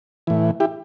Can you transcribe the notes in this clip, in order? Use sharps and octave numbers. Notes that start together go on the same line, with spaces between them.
A2 E3
E4 G4